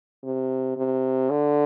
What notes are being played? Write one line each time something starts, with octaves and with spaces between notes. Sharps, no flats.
C3
C3
D3